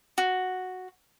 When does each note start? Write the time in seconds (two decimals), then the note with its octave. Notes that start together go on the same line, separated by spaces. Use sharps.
0.18 F#4